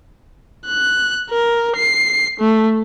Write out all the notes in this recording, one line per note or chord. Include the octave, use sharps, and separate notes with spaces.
F#6
A#4
C7
A3